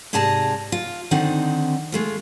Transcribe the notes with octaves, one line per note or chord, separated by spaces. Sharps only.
G#2 C3 G#4 D5 A5 A#5
F4
D3 D#3 C4 D#4 F#5
G#3 A3 F4